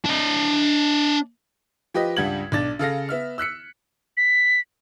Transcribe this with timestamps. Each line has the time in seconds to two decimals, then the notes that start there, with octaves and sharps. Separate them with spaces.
0.05 D4 D#5
1.94 F3 G4 B4 D#5
2.16 C#2 G2 G3 F#5 G#6 F#7
2.52 B1 D4 A6
2.79 C#3 A4 F5 A#6
3.09 B3 E5 F6
3.38 E6 F#6 B6 C#7
4.17 B6